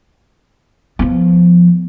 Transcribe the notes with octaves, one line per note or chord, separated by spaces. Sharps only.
F3 B3